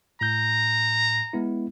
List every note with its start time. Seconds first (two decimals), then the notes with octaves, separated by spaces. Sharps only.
0.21 A2 A#5 G6
1.33 G#3 B3 E4